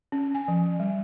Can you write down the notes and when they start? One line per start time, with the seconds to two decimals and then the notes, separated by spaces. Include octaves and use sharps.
0.12 C#4
0.35 G#5
0.48 F3
0.80 G3